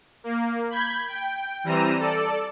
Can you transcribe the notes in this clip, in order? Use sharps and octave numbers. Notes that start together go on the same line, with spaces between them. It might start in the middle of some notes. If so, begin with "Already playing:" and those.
A#3
B5 G6 G#6
G5
E3 G3 C4 A#5 D#7 E7
A4 D5